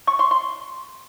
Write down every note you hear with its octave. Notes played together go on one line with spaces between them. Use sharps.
C#6
C6
C6